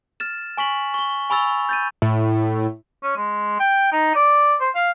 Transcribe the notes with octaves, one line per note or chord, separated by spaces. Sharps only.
F6 A6 E7
G#5 C#6 B6 F#7
C#6 G7
G#5 B5 C#6 E6 A6 F7
G6 A6 D#7
A2
C#4
G#3
G5
D#4
D5
C5
F5